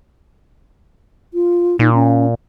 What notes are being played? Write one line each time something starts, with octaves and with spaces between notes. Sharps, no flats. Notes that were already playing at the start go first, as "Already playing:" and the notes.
F4
A#2 D#4
C#4